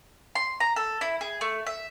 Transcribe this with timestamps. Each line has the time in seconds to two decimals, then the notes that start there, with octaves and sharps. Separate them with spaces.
0.35 C6
0.60 A#5
0.76 A4
1.01 E4
1.21 G#4
1.41 A3
1.67 E5